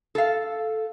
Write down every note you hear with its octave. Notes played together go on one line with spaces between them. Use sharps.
A4 F5